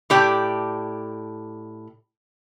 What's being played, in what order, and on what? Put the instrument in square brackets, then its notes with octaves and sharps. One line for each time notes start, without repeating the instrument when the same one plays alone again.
[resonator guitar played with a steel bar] A2 G4 D5